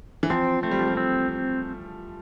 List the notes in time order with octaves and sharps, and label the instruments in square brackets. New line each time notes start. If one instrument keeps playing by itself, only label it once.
[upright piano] E3
[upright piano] F3 [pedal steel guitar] C4
[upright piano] A3 [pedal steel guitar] C4
[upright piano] G3
F3
G3
[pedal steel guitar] C4